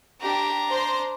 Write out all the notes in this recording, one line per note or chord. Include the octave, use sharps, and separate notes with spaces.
D4 G4 A#5
C5 C6